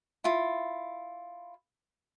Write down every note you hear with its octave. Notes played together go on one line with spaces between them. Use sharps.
E4 F4